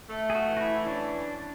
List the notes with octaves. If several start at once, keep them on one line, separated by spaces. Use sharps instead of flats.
A3
G#4
F#4
E3
F#4
E4
C#4 D4